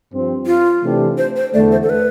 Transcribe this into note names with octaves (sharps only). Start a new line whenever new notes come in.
G2 F3 C4
F4
C3 E3 A3 D4 G4
C5
C5
E2 D3 A3 D5
C5
A4
B4